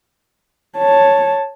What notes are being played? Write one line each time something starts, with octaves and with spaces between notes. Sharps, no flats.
C#5 A5